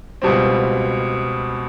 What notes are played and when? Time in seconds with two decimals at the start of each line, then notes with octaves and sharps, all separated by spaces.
0.22 C#2 B2 G3 C4